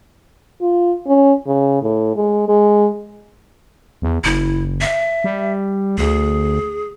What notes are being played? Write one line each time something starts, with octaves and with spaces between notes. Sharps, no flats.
F4
C#4
C#3
A2
G#3
G#3
E2
F#1 E4
E5
G3
D2 G#4